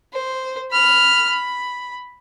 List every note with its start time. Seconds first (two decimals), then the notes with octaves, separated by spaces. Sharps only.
0.13 C5
0.71 B5 F6
1.29 B5